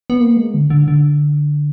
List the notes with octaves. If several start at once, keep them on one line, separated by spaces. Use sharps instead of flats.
B3
A#3
G#3
D3
D3
D3